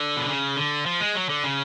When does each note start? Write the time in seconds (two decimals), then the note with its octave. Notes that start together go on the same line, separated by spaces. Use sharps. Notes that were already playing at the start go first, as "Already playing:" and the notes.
Already playing: D3
0.17 B2
0.29 C#3
0.56 D3
0.86 F3
1.00 G#3
1.15 F#3
1.29 D3
1.44 C#3